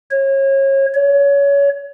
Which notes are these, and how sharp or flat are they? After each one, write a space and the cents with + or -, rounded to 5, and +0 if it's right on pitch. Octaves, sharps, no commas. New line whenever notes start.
C#5 -30
C#5 +25